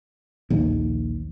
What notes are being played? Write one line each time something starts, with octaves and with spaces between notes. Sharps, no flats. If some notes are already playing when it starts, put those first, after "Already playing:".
A#1 D#2